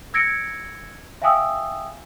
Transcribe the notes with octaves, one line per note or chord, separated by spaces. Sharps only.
E6 G#6 A#6 C#7 D7
E5 F5 G5 G#5 D#6 E6